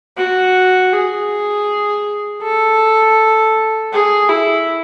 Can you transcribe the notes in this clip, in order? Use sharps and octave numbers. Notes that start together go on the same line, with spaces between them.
F#4
G#4
A4
G#4
E4